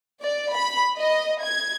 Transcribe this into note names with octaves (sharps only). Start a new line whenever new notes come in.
D5
B5
D#5
G#6